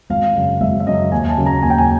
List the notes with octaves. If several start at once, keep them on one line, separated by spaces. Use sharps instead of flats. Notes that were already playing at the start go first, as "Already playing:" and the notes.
G#1 F5
F#2 C#3
G#1 E5
E5
F#2 C#3 D#5
D#2 G#5
A5
C#3 F#3 A#3
A#5
D#2 G#5
G5
G#5